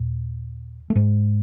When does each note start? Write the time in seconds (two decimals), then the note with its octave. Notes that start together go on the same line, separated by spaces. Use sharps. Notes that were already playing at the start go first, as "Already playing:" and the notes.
Already playing: D#2 A#2
0.90 A3
0.95 G#2 G#3